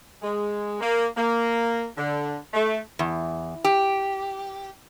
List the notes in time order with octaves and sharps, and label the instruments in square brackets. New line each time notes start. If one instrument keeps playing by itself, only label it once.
[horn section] G#3
A#3
A#3
D3
A3
[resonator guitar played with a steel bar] E2
G4